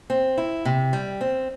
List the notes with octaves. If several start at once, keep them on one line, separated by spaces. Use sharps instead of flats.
C4
E4
C3
G3
C4